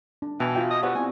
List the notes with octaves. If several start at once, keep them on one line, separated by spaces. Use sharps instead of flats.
D4
B2 E3 G5 A5
F4 F#4 E5 G5
D#5
B3 G4 C5 D5 F#5 C#6 E6
B3 C4 E4 G#5